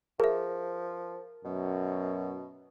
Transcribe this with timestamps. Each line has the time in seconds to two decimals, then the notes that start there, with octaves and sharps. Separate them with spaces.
0.20 F3 G#4 A#4 E5
1.45 F#2 B2